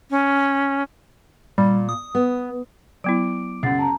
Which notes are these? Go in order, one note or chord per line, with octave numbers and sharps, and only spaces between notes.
C#4
A#2 G3
D#6
B3
F#3 B3 E4 D6 D7
C#2 F#2 F#5 A6 C7
A5 A#5